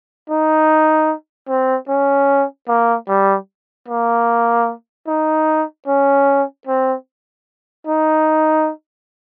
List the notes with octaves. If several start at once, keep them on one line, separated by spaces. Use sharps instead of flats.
D#4
C4
C#4
A#3
G3
A#3
D#4
C#4
C4
D#4